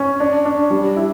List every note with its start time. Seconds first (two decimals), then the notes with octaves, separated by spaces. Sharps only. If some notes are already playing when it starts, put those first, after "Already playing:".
Already playing: C#4
0.20 D4
0.45 D4
0.70 G3
0.97 E4